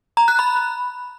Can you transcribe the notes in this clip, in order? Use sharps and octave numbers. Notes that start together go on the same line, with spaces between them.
A#5
F#6
B5